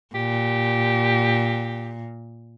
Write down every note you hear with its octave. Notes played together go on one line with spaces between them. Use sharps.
A#2 G4